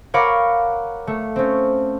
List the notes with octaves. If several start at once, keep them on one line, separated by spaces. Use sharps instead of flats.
A#4 C#5 F5 F#5 B5 D6
A3
C4 C#4